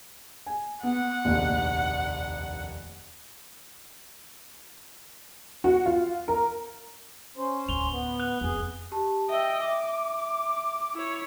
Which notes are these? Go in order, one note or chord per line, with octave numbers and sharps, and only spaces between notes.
G#5
B3 F#5
F1 A#1 D#2
F#4
F4
A#4
C#4 C5
D2 A2 F7 G7
B3
F#6 F7 G7
F2 C4 G#4
G4 A5
D#5 E5 G5 E6
E5 D6
E4 C#5